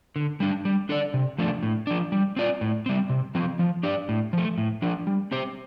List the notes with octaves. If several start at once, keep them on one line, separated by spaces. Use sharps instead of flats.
D3
G3 D4
G3
D4 A4 D5
C3
F3 A3 D4
A2
F3 D4
G3
C4 F4 D5
A2
G3 C4
C3
F3 C4
F3
D4 G4 D5
A2
F3 A3
A2
F3 D4
G3
C4 G4 C5